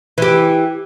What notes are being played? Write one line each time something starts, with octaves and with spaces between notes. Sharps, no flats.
E3 G4